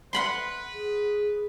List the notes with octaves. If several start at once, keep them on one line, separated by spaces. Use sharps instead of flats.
B4 F#5 B5 C6
G#4